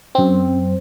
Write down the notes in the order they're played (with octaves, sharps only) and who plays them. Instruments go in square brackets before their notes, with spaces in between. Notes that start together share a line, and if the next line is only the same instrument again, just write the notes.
[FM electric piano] F#2 C4